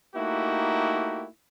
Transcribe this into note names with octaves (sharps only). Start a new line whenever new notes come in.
A3 A#3 D#4 E4 F#4 G4